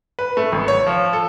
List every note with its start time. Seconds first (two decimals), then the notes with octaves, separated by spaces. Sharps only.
0.19 B4
0.37 A3
0.52 G#1
0.68 C#5
0.87 F3
1.13 A4